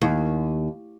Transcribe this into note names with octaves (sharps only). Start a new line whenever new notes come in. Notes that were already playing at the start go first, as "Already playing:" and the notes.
D#2